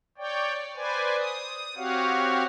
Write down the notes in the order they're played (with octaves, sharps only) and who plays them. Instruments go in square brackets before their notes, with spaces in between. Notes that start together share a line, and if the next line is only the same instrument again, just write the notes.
[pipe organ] C#5 D5 G5
B4 C5 D5 G#5
D#6
C4 F#4 G4 C#5 F5 F#5